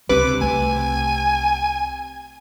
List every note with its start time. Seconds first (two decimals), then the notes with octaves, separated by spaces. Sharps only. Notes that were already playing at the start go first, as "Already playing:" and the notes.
0.09 C#2 C3 G3 D4 B4 D6
0.41 C2 A3 G#5